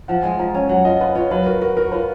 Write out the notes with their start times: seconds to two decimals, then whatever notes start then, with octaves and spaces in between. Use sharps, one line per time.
0.08 F3 F#5
0.23 G#3 G#5
0.39 F3 A#5
0.54 C#4 G#5
0.69 F#3 F#5
0.85 F4 D#5
1.00 F4 B4
1.15 F4 C#5
1.31 F#3 B4
1.46 F#4 A#4
1.61 F#4 A#4
1.77 F#4 A#4
1.92 F4 B4